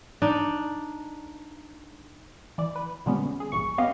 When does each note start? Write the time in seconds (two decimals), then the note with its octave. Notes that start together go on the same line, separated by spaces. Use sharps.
0.22 D4 D#4
2.58 E3 D5
2.76 B4
3.06 A#2 D3 G3 G#3 B3 C#4
3.40 G#4
3.52 A#1 E2 G2 C#6
3.78 B3 C#4 G4 D#5 F5